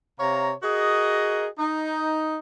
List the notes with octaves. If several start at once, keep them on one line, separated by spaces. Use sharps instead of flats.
C3 C#5 F5 A#5
F#4 G#4 A#4 D#5
D#4